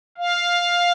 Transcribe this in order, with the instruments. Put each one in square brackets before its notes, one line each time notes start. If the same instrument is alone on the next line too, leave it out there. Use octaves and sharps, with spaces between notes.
[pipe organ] F5